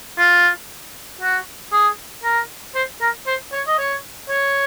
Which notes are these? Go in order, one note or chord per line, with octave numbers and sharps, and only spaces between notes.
F4
F#4
G#4
A#4
C5
A#4
C5
C#5
D#5
C#5
C#5